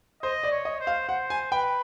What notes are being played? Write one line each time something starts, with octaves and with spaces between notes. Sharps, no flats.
C5 D#5
D5
C#5
D#5
C5
F5
C5 F#5
G#5
B4 G5